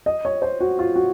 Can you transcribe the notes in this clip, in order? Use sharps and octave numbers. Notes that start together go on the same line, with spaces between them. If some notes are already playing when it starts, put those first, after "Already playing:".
D#5
C#5
C5
F#4
F4
F#4